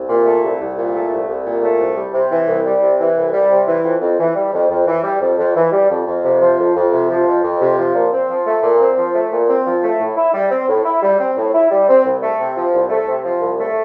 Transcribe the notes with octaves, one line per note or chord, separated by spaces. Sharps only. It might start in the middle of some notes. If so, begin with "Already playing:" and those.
Already playing: C2
A#2
A3
C2
C2
A#2
A3
C2
C2
A#2
A3
C2
G3
C3
E3
C2
G3
C3
E3
C2
G3
C3
E3
F2
F2
E3
G3
F2
F2
E3
G3
F2
F2
E3
G3
F2
F2
C3
F3
F2
F2
C3
F3
F2
F2
C3
F3
A#2
C4
F3
A3
A#2
C4
F3
A3
A#2
C4
F3
A3
A2
E4
G3
C4
A2
E4
G3
C4
A2
E4
G3
C4
C2
A3
C3
F3
C2
A3
C3
F3
C2
A3